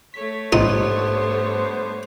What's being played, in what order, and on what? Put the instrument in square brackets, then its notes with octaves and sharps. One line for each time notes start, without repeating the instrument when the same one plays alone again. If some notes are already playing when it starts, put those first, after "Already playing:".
[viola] A3 C#5 [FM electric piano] B6
[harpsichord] A1 D#4 C6 [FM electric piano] G#2 G3 [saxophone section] D3 B3 C5